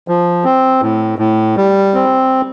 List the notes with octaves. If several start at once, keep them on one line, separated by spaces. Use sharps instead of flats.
F3
C4
A2
A2
G3
C4